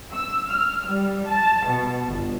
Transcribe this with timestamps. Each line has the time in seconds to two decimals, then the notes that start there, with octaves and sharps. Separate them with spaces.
0.13 E6
0.50 F6
0.86 G3
1.28 A5
1.66 B2
2.08 G1